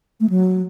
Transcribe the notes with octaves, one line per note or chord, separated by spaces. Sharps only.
A3
F#3